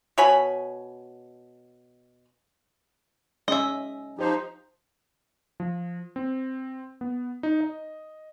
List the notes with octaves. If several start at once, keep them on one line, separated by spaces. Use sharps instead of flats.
B2 C#5 G#5 B5
G#3 C#4 D#5 E5
F3 D#4 G4 C5
F3
C4
B3
D#4
D#5